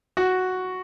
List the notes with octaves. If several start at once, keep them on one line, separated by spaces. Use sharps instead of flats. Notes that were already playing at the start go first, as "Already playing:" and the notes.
F#4